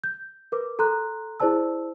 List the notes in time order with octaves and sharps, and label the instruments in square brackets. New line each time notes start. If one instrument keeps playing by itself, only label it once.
[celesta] G6
A#4 B4 D6
A4 A#5 C6 F#6
E4 G#4 C5 D5 A5 E6